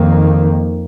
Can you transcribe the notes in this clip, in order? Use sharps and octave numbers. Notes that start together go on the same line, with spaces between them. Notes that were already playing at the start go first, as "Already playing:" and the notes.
Already playing: F2 D#3 A#3